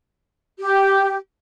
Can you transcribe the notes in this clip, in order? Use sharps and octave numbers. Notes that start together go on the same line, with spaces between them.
G4